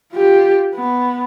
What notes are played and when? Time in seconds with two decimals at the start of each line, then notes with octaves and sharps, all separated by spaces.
0.13 F4 G4
0.75 B3